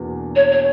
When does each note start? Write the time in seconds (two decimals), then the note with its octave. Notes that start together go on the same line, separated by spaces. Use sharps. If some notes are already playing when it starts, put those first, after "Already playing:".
Already playing: E2 B2 A#3 D4
0.35 C#5
0.51 C#5